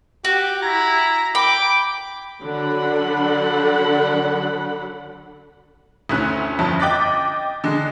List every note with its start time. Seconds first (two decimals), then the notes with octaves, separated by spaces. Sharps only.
0.25 F#4 G4
0.62 E4 A#5
1.35 G5 B5 D6
2.43 D3 F#3 D4 F#5 B5
6.09 D2 A3 C#4 E4 F#6
6.59 G1 F2 C#4 E5 A5
6.80 D#5 G5 D6 F#6 A6 B6
7.64 D3 G#3